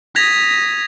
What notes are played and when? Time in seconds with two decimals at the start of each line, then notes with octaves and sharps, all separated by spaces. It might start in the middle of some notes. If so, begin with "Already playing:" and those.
0.16 D#6 G#6 A#6 B6 F7